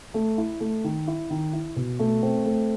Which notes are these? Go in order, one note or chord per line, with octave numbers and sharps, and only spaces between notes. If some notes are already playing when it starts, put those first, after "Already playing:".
A3
E4
A3
D#3
E4
D#3
E4
B2
A3
C4
A3